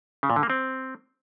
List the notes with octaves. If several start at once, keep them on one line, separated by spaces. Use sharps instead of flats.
C#3
A#2
D3
A#3
C4